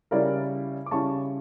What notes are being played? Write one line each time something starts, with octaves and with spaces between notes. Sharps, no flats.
C#3 G3 C#4 E4 A#4 D5
D6
C#3 G3 C#4 E4 A5 C#6